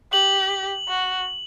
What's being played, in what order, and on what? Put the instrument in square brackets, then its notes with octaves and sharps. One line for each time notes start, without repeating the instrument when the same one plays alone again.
[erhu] G4 [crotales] F#7
[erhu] F#4